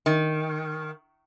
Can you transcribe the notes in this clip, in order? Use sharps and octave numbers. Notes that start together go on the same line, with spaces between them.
D#3